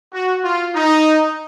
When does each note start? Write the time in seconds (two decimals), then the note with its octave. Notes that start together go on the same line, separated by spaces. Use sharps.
0.12 F#4
0.44 F4
0.74 D#4